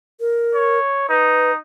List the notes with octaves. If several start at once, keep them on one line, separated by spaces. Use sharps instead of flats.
A#4
C#5
D#4 B4